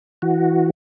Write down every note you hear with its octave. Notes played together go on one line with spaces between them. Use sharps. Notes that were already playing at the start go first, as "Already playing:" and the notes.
E3 F#4